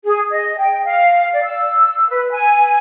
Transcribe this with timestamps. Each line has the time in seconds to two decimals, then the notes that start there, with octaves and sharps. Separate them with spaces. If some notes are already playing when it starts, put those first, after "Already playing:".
0.05 G#4
0.31 D#5
0.58 G5
0.85 F5
1.33 D5
1.44 E6
2.09 B4
2.32 G#5